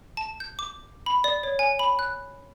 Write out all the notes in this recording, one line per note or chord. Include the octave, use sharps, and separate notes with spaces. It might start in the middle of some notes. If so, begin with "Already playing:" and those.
A5
G6
D6
B5
D5
C#5
G#5
B5
F#6